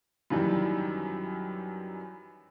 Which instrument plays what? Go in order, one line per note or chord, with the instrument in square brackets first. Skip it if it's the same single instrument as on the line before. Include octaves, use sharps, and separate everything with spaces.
[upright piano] F#2 D#3 E3 G3